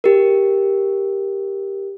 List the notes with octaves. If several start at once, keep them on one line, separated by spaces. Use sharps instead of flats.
G4 A#4